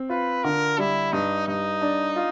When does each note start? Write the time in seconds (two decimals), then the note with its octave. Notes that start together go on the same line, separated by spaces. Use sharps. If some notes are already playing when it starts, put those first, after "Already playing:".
Already playing: C4
0.10 F4 B4
0.44 D3 A#4
0.78 G3 E4
1.12 G2 D#4
1.48 G2 D#4
1.81 D4
2.16 F4